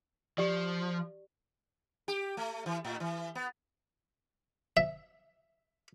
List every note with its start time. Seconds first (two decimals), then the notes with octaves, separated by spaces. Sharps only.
0.38 F3 G4 D5
2.08 G4
2.37 A3
2.66 E3
2.85 A2
3.00 E3
3.35 B3
4.77 E5